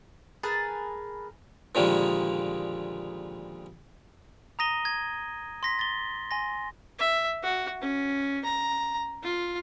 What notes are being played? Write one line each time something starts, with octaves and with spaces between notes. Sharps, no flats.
G#4 A#4 B4 A5
A#2 D3 D#3 F3 G3 G#3
A#5 D#6 A#6 D#7 G7
G#6
C6 A#6 B6
A6 G7
G#5 C6 A#6
E5
F#4
C#4
A#5
F4